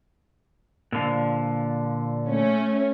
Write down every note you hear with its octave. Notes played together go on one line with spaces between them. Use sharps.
A#2 D3 F3
A3 C#4